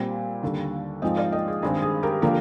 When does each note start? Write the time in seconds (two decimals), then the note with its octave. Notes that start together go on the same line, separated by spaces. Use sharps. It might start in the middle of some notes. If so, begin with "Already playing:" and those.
Already playing: A#2 G3 C4
0.43 D#2 D3 G3
1.02 G#2 F3 G#3 C4 D#5 G5
1.17 D5 F5
1.32 D#5 G5
1.48 G#4
1.62 G2 D#3 G#3 C4 G#4
1.82 G#4
2.03 G4 A#4
2.22 D3 F3 A#3 G4 A#4